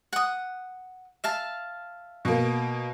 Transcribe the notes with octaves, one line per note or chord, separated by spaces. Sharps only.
F#5 D#6
E5 F5 A5
B2 A#3